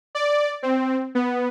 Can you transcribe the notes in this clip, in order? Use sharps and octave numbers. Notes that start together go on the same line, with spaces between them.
D5
C4
B3